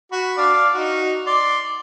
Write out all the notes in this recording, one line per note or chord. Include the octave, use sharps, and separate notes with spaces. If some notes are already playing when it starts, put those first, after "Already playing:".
F#4 B5
D4 D5 F5
D#4 F#4
D5 C6